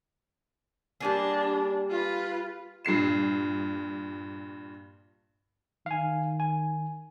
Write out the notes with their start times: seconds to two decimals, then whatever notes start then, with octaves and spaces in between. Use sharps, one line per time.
1.00 G3 A#3 D4 G#4
1.90 F4 B4
2.85 G2 A#2 C7 E7
5.86 D#3 F5 G#5
6.40 G#5